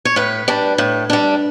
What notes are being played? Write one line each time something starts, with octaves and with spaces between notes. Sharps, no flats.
C#5
A2 B4
G3 D4
A2
G3 D4